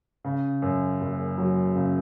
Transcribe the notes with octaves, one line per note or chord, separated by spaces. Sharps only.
C#3
F#2
F#1
F#3
C#3